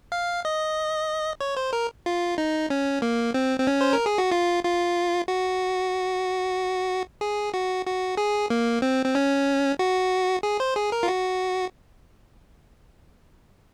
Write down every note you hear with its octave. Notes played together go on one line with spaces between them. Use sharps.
F5
D#5
C#5
C5
A#4
F4
D#4
C#4
A#3
C4
C4
C#4
C5
A#4
G#4
F#4
F4
F4
F#4
G#4
F#4
F#4
G#4
A#3
C4
C4
C#4
F#4
G#4
C5
G#4
A#4
F4
F#4